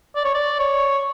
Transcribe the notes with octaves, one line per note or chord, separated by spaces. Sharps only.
D5
C#5
D5
C#5